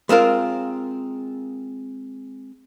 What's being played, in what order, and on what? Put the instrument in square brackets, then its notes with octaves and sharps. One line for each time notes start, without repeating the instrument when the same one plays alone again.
[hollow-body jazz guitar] G#3 C4 F4 A#4